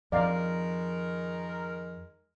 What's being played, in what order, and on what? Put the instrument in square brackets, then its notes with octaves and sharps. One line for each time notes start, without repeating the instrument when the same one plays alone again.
[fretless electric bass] F2 F3 [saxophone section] D#3 G#3 A#4 [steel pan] D5 F5 A#5